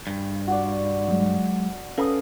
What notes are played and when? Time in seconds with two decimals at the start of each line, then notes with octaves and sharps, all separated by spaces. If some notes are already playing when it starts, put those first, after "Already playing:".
0.07 G2
0.47 F#4 D5
1.09 F#3 G#3
1.98 C#4 A4 B4 F5 B5 D#6